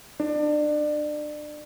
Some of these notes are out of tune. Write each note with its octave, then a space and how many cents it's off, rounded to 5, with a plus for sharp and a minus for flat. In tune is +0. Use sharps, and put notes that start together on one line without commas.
D4 +30